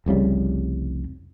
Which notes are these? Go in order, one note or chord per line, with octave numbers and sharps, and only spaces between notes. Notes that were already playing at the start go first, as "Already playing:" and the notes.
F1 C2 C#3 G3